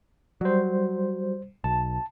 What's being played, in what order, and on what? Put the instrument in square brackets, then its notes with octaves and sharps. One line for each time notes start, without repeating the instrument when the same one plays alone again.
[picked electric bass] F#3 [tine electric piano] G3 C5
[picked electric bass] B1 [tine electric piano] A5